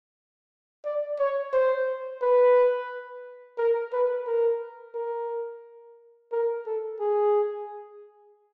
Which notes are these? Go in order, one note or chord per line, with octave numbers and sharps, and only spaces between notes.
D5
C#5
C5
B4
A#4
B4
A#4
A#4
A#4
A4
G#4